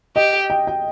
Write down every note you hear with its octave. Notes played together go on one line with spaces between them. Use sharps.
G4 D#5
G5
G5